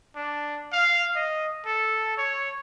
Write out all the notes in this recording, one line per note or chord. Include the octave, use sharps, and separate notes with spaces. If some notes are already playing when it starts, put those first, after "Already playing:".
D4
F5
D#5
A4
C#5